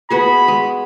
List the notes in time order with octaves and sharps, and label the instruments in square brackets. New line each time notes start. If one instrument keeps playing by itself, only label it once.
[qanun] B3 F#4 G#4 [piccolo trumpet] B5
[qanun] G#3